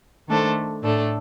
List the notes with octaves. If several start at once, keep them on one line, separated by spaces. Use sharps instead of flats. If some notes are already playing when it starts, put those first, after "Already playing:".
D#3 A3 D4 A4 C5
A2 A3 D4 A4